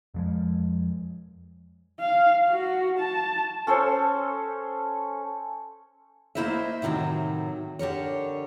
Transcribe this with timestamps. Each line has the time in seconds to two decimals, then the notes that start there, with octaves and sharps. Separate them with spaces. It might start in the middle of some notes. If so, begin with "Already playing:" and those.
0.14 F2 F3 G#3
2.00 F5
2.49 F#4
2.99 A5
3.67 C#4 A4 C5 C#5
6.35 A3 A#3 E4 C5 D#5 E5
6.82 A2 C3 D#3 F3 F#3
7.79 D3 G4 A#4 C#5